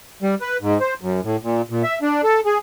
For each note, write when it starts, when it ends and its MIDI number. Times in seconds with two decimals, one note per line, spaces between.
0.22 0.35 55
0.41 0.57 71
0.61 0.78 44
0.80 0.94 72
1.01 1.20 42
1.24 1.37 45
1.43 1.62 46
1.70 1.83 46
1.83 1.99 76
2.02 2.22 62
2.24 2.40 69
2.46 2.58 68